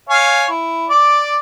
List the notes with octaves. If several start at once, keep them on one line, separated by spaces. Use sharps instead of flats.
C#5 F5 G#5
E4
D5 D6